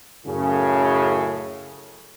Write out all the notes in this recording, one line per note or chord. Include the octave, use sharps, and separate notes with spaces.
F#2 A2 C#3